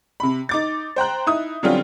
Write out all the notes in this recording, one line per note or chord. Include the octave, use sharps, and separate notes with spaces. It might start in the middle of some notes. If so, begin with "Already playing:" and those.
C3 B5
D#4 D6 A6
C5 G5 A#5 F#6
D#4 E4 D#6
D3 F#3 G3 C4 C#4 F4